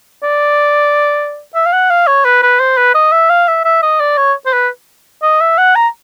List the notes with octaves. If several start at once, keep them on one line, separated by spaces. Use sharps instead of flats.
D5
E5
F5
F#5
F5
C#5
B4
B4
C5
B4
D#5
E5
F5
E5
E5
D#5
D5
C#5
C5
B4
D#5
E5
F#5
A#5